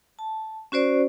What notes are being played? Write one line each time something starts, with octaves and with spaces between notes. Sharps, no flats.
A5
C#4 F#4 C5 D5